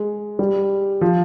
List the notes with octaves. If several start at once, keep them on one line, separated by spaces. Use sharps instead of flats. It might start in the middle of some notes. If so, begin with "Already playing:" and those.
Already playing: G#3
G3
F3